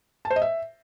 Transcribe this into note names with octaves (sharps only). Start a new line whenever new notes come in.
A5
C5
D#5
E5